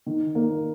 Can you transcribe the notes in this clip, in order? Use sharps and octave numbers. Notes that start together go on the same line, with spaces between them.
D#3
A#3